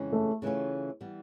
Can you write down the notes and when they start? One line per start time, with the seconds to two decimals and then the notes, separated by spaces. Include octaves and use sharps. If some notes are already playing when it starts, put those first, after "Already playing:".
Already playing: F2 C#3 E3 G#3 C#4
0.13 A3
0.42 C#3 E3 A3 C#4 F4
1.01 E3 G3 B3